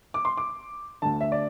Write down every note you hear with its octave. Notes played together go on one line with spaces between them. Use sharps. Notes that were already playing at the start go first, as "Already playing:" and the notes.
D6
C6
D6
D2 D3 A5
E5
D5